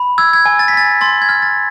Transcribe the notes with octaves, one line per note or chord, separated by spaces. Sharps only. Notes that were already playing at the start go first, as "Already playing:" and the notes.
Already playing: B5
E6 G#6
G#6
G#5
A6
B6
G#5 A6
C6 A6
G#6
F6
A6